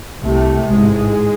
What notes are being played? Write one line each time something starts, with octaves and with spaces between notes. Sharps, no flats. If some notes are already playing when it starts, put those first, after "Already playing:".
C2 C3 A3
A1 G#2 G#3